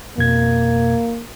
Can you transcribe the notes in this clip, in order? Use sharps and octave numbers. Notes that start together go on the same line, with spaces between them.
F2 B2 A#3 G#6